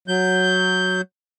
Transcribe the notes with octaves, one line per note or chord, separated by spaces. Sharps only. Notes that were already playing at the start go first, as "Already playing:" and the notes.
F#3 G6